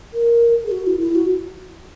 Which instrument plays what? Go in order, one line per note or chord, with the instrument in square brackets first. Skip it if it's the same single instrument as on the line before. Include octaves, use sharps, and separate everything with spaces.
[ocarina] A#4
G#4
F#4
E4
E4
F#4